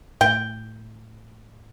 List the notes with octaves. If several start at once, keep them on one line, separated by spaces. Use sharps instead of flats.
A2 G5